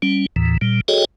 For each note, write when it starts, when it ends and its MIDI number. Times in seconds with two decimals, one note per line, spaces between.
0.02 0.26 55
0.02 0.26 61
0.36 0.57 39
0.36 0.57 45
0.36 0.57 52
0.61 0.81 46
0.61 0.81 55
0.88 1.05 66
0.88 1.05 68
0.88 1.05 69
0.88 1.05 73
0.88 1.05 75
0.88 1.05 79